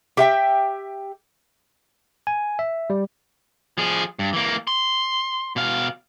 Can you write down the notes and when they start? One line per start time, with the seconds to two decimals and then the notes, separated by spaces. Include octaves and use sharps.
0.17 G4 E5 G5
2.27 G#5
2.59 E5
2.90 G3
3.78 F3 G#4
4.19 G2
4.33 E3 A#3
4.67 C6
5.56 B2 F5